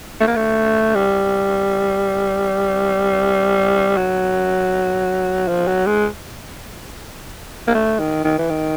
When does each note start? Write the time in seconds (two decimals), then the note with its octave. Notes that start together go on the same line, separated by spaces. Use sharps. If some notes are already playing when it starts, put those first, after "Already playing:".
0.20 A3
0.27 A#3
0.36 A3
0.95 G3
3.97 F#3
5.48 F3
5.68 F#3
5.86 G#3
7.68 A#3
7.75 A3
7.99 D#3
8.24 D#3
8.38 E3
8.50 D#3